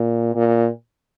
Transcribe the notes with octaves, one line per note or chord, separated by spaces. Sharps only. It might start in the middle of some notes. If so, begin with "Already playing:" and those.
Already playing: A#2
A#2